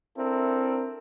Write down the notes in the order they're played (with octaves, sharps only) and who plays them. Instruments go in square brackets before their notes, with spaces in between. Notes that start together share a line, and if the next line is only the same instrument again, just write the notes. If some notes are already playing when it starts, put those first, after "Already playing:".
[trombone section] C4 D4 E4 A4 A#4